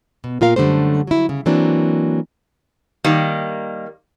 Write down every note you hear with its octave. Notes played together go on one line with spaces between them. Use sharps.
B2
A#2 F4 A#4 F5
F#2 D3 G3 A3 C5
F#3 E4
C#3
E3 F#3 A#3 C4 D4
D#3 G3 A#3